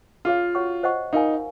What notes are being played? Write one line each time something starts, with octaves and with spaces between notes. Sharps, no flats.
C#4 F4 G#4 C#5 F5
F#4 C#5 F#5 C#6
C5 D#5 F#5 C#6
D#4 F4 A#4 F5 G#5